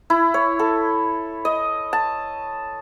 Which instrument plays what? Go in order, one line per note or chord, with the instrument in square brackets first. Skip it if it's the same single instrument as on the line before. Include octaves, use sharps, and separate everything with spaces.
[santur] E4
C#5
A4
D#5
A5